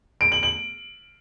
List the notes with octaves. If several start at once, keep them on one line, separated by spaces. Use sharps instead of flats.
D7
F#7
F#7